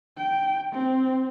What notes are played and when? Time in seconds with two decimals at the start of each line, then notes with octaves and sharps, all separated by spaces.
0.17 G5
0.72 C4